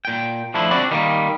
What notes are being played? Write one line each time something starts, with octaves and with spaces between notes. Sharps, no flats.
A#2 G5
F3 A3 D4 E4
C4 D4 F#4 D5
D#3 G3 A#3